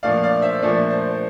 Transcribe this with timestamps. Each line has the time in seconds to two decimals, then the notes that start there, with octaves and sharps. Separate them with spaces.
0.03 A#2 F3 A3 D4 D5 F5
0.23 D5 F5
0.42 C5 E5
0.62 A#2 F3 A3 D4 D5
0.91 C5